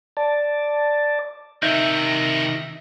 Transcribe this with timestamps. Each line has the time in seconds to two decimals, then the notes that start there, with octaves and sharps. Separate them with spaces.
0.17 D5 A5
1.63 C3 D#3 D#4 E5 G6 A#6